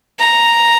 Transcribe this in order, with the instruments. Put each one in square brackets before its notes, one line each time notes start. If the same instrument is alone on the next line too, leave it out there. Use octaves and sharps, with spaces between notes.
[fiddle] A#5